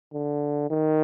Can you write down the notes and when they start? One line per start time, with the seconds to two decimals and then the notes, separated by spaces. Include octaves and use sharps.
0.13 D3
0.70 D#3